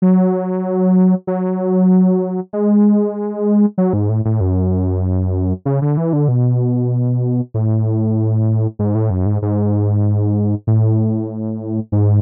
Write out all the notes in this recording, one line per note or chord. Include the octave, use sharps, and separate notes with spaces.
F#3
F#3
G#3
F#3
G#2
A2
A2
F#2
C#3
D3
E3
D3
B2
A2
G#2
A2
F#2
G#2
G#2
A2
G#2